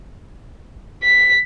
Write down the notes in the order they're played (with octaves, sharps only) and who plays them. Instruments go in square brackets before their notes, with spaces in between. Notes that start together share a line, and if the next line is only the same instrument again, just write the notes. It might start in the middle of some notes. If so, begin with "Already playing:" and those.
[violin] B6